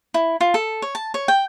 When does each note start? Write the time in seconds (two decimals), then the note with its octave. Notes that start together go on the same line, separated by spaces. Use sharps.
0.14 E4
0.41 F4
0.54 A4
0.82 C#5
0.95 A5
1.14 C#5
1.28 G5